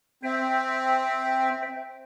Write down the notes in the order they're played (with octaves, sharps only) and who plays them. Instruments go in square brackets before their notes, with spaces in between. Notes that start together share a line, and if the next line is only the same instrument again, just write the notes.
[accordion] C4 [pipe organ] C5 E5 G5